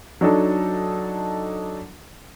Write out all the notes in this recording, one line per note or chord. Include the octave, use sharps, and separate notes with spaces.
F#3 D4 D#4 A4